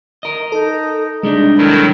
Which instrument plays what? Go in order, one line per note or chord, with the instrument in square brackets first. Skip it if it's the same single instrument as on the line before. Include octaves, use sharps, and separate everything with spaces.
[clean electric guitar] A#4 D#5
[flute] D#4 [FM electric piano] A4
[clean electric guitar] C2 G3 D4 [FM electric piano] G#3 [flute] D#4
[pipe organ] D#3 F#3 E4 [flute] A4